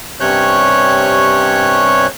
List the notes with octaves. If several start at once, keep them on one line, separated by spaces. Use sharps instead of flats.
G2 C3 C#4 C#5 F#6 G6